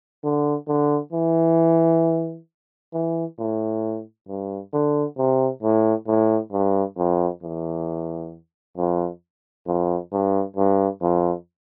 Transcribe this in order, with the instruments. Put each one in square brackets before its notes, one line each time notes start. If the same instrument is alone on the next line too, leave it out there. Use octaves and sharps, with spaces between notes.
[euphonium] D3
D3
E3
E3
A2
G2
D3
C3
A2
A2
G2
F2
E2
F2
F2
G2
G2
F2